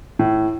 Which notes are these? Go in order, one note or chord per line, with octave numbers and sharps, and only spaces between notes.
A2